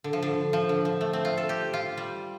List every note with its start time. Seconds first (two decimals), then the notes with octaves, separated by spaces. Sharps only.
0.04 D3
0.13 F3
0.23 D3
0.53 F3
0.69 D3
0.85 F3
1.01 A3
1.13 C4
1.25 F4
1.37 A4
1.49 G4
1.74 F4
1.97 G3